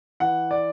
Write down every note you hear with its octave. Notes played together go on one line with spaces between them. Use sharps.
E3 F#5
D5